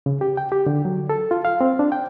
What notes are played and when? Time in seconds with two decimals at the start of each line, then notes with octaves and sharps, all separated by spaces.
0.06 C#3
0.21 G4
0.37 G5
0.52 G4
0.67 D3
0.85 F#3
1.09 A4
1.31 F4
1.45 F5
1.61 C4
1.79 D4
1.92 G5